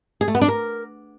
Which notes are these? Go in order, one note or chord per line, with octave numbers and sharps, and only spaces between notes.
G#4
A3
B3
D4
A#4